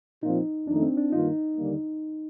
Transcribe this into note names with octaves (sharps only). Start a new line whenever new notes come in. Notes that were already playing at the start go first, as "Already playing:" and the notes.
A#2 F3 C4 D#4 F4
F2 D#3 A3 D4 D#4
C4
D4
G2 D#3 A#3 D#4 F4
D#2 D3 G3 A#3